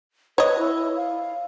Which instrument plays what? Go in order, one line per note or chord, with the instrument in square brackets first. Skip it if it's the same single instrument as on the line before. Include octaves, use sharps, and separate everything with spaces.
[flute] B4 [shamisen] C#5 D#5
[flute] E4
F5